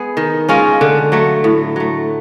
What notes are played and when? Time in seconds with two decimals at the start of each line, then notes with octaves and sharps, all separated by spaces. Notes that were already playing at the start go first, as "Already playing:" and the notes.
Already playing: G#3 B3 G#4
0.17 D#3
0.49 G#3 C#4 F4
0.81 D3
1.12 F#3 A3
1.44 A2
1.76 F#3 A3